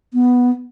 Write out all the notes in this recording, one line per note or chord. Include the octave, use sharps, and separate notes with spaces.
B3